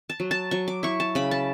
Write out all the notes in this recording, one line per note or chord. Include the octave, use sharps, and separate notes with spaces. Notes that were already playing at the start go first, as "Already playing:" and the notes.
A5
F#3
A5
F#3 C#6
D6
E4 C#6
A5
C#3 B5
A5